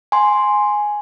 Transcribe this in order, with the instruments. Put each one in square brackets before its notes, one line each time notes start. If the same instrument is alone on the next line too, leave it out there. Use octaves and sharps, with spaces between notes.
[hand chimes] G#5 C6